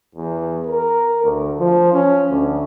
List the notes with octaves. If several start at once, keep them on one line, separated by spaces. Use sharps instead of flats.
E2
A#4
D2
F3
C#4
D2